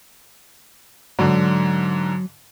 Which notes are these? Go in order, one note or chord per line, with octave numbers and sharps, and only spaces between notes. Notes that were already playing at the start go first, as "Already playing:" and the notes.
G#2 D3 F#3